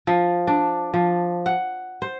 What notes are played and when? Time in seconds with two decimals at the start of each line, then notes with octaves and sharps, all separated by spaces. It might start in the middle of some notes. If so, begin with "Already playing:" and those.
0.07 F3
0.47 D4
0.94 F3
1.46 F#5
2.02 C5